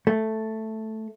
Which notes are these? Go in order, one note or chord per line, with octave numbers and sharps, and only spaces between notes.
A3